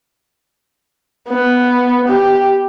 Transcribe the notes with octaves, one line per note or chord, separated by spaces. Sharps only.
B3
G4